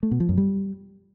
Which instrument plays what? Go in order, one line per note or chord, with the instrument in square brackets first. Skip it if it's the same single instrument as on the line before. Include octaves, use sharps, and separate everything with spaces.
[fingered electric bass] A3
B2
F3
F#2
G3